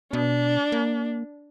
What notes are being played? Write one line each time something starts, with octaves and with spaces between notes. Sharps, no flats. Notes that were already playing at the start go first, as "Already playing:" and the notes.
B2 D4
A#3